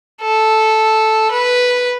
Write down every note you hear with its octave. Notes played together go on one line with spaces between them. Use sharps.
A4
B4